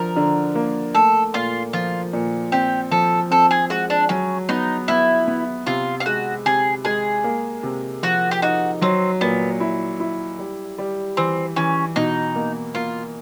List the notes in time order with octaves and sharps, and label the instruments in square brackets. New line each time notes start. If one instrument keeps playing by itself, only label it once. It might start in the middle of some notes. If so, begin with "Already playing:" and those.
Already playing: [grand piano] D3 F3 [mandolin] A#4
[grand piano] D3
A#3
[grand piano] A3 [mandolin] A4
[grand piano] A#2 [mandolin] F4
[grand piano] F3 [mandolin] F4
[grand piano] A#2
[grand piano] C4 [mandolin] G4
[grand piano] F3 [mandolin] A4
[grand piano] C4 [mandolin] A4
[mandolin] G#4
[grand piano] G#3 [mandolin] F#4
[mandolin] D4
[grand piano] F#3 [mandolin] C#4
[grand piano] B3 [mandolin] D#4
[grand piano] B3 [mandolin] E4
[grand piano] B3
[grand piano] C3 [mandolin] F4
[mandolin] F4
[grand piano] G#3 [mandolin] F#4
[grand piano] C3 [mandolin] G#4
[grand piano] G#3 [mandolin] G#4
[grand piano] A#3
C3
[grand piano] F3 [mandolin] F#4
[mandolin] G4
[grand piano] D#4 [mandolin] F#4
[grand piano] F#3 [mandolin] C4
[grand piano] A#2 [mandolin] B3
[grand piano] E4
E4
G3
G3
[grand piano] E3 [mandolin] C4
[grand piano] E3 [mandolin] C#4
[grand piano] B2 [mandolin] D#4
[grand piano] A#3
[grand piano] A#3 [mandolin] F4